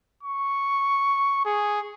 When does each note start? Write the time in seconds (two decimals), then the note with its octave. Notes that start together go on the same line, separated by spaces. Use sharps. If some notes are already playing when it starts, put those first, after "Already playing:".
0.23 C#6
1.45 G#4